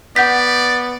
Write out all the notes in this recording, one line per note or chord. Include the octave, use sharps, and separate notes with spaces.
B3 D5 F#5 G6 B6